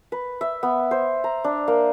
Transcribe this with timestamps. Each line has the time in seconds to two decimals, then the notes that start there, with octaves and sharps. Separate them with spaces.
0.12 B4
0.41 E5
0.63 B3
0.91 C5
1.24 A#5
1.44 D4
1.68 A#3